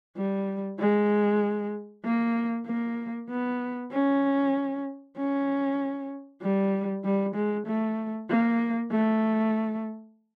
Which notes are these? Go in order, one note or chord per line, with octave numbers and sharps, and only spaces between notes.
G3
G#3
A#3
A#3
B3
C#4
C#4
G3
G3
G#3
A3
A#3
A3